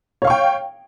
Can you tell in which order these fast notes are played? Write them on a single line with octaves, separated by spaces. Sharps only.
C#5 F5 C#6 G5